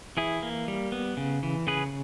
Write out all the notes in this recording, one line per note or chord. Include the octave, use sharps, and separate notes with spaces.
E3 E4 G#4
A#3
G3
B3
C#3
E3
C#3 G#4 B4